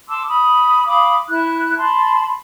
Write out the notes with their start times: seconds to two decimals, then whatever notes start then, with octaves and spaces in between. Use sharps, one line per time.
0.08 A5 C6 D6 E6
0.27 B5 D#6
0.85 F5 B5 D6 D#6
1.28 E4 F#6
1.77 A5 B5 C6